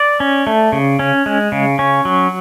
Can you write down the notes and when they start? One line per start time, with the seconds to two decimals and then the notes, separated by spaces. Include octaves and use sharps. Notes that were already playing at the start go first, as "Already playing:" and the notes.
Already playing: D5
0.20 C#4
0.47 A3
0.72 C#3
0.99 C#4
1.26 G#3
1.52 C#3
1.79 C#4
2.05 F#3